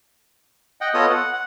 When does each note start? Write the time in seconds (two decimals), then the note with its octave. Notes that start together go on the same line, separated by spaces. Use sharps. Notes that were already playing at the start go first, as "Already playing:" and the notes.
0.81 D#5 F#5 G5
0.94 B3 F4 A4 C#5 D#5 D#6
1.10 F#5
1.33 F#5